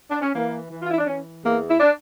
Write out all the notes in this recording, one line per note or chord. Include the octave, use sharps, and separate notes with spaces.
D4
C#4
E3 A#3
E3
F4
E4
D4
E3 C#4
E2 A#3
E4
D4